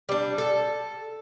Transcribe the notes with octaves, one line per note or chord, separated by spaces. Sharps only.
G3 D4
A4